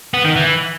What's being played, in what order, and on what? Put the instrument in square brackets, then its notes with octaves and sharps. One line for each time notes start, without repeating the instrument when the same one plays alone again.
[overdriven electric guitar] B3
D#3
E3